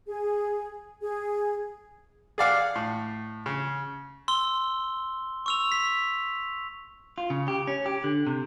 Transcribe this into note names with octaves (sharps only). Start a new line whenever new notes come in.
G#4
G#4
G#4 D5 F5 F#5
A2
C#3
C6 E6 G7
C#6 E6 F7
B6
F4
C#3
G4
C#4
G4
D3
C3